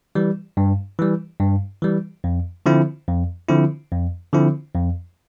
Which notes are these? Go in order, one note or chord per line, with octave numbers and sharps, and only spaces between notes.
E3 G3
G2
E3 G3
G2
E3 G3
F2
D3 F3 C4 E4
F2
D3 F3 C4 E4
F2
D3 F3 C4 E4
F2